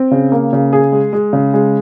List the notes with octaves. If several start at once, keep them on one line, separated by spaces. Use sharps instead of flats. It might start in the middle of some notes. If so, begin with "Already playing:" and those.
Already playing: C4
C#3
A#3
C#3
G#4
G#3
G#3
C#3
G#3